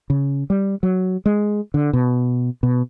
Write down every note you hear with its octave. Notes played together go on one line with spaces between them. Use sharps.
C#3
G3
F#3
G#3
D3
B2
B2